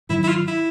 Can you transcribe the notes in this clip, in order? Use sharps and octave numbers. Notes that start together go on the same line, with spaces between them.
G#2 D#3 F#3 E4
E4
F4
E4